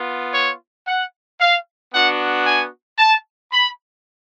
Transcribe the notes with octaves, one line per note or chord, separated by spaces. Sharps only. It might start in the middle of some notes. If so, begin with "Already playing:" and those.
Already playing: B3 F4
C#5
F#5
F5
B3 D4 F#4 F#5
G#5
A5
B5